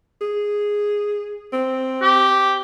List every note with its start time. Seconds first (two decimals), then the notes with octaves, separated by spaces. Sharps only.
0.21 G#4
1.52 C4
2.02 G4